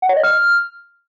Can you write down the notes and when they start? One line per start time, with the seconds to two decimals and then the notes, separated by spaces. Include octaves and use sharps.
0.02 F#5
0.09 C#5
0.16 D#5
0.24 F6